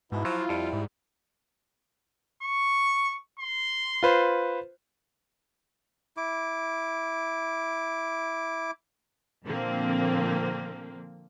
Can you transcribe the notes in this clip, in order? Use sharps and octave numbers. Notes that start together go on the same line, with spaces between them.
G#2 B2 E4
F3 F#3 F4
F2 G3
G#2
C#6
C6
F4 B4 C5
E4 D6
A#2 D3 F3 A#3 C4